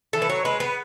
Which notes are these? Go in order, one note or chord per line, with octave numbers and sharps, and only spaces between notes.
E3 A4
B4
F#3 C#5
G#3 B4
B3 B4